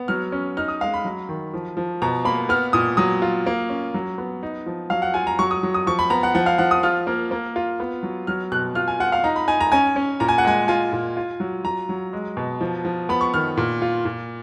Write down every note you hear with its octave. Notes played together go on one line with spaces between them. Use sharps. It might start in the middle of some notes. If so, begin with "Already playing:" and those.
Already playing: B3
F#3 F6
C#4
D#4 F6
D#6
G#3 F5
B5
F#3
D#3
F3
F3
B2 A#5
A#3 B5
B3 F6
A#2 D#6
F#3 D#6
F4
A#3
C#4
F#3
B3
D#4
F3
F#3 F5
F#5
F4 G#5
A#5
F#3 C#6
D#6
F#3
D#6
F3 C#6
B5
B3 A#5
F#5
F3 F#5
F5
F3 F#5
D#6
F4 F6
A#3
A#3
F4
B3
F#3
F#3 F6
B2 F#6
F4 F6
G#5
F4 F#5
F5
D#4 A#5
B5
D#4 G#5
A#5
C#4 G#5
C#4
A#2 A#5
G#5
F#5
G#3 G#5
F4 G#5
A#2
F4
F#3
F#3 A#5
F#3
G#3
B2
F3
F3
B3 B5
C#6
D#3 F6
A#2
F4
A#2